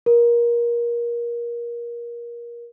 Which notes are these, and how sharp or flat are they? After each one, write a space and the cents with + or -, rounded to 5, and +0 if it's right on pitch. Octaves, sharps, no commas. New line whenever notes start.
A#4 +25